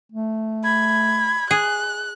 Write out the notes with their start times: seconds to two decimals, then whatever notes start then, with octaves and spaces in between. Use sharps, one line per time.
0.12 A3
0.64 B5 G#6
1.51 G#4 F#6